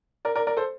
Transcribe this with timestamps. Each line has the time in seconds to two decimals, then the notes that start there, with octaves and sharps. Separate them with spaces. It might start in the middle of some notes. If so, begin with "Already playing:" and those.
0.25 A#4 D5
0.35 A#4 D5
0.47 A#4 D5
0.57 A4 C5